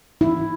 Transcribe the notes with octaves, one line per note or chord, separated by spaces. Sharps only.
E4